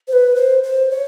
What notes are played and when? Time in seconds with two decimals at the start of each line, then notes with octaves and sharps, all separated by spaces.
0.08 C5
0.13 B4
0.35 C5
0.63 C5
0.90 C#5